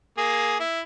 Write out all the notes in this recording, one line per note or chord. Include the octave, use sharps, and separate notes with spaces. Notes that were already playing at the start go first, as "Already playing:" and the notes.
A#3 G#4
E4